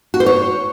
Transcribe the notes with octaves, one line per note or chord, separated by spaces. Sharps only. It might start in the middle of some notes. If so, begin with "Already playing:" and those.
F#4
C5
C#5